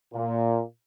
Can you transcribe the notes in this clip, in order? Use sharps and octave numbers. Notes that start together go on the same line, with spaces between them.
A#2